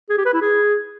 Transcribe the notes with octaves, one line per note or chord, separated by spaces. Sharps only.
G#4
G4
B4
E4
G#4